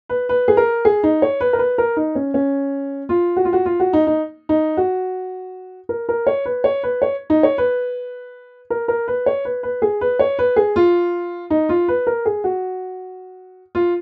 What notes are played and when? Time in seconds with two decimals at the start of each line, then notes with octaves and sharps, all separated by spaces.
0.09 B4
0.29 B4
0.48 G#4
0.57 A#4
0.85 G#4
1.03 D#4
1.22 C#5
1.41 B4
1.53 A#4
1.59 B4
1.78 A#4
1.97 D#4
2.15 C#4
2.34 C#4
3.09 F4
3.37 F#4
3.45 F4
3.53 F#4
3.66 F4
3.80 F#4
3.93 D#4
4.07 D#4
4.49 D#4
4.77 F#4
5.89 A#4
6.09 A#4
6.27 C#5
6.46 B4
6.64 C#5
6.83 B4
7.02 C#5
7.30 D#4
7.43 C#5
7.58 B4
8.70 A#4
8.88 A#4
9.08 B4
9.26 C#5
9.45 B4
9.63 B4
9.82 G#4
10.01 B4
10.19 C#5
10.39 B4
10.56 G#4
10.76 F4
11.50 D#4
11.69 F4
11.88 B4
12.07 A#4
12.26 G#4
12.44 F#4
13.75 F4